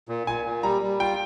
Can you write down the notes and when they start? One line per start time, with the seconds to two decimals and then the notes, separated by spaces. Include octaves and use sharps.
0.09 A#2
0.27 A#2 G#5
0.45 A#2
0.63 G3 A#5
0.82 G3
1.00 F4 G5